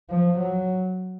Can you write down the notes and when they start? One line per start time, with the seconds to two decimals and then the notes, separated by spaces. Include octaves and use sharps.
0.10 F3
0.39 F#3